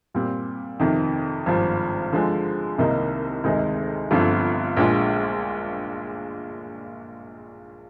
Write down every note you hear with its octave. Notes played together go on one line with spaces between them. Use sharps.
A#2 G3 C4
F2 C3 D#3
G#1 G2 F3
D3 F3 G#3
C2 C3 D#3 A#3 D#4
D2 C3 D#3 G#3 D#4
G1 G2 D3 F3 C4
A#1 A#2 G#3 D4 F4